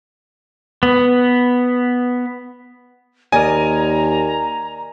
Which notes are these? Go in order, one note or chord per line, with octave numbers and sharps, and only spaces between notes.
B3
D#2 A#4 D5 D#5 G#5 A#5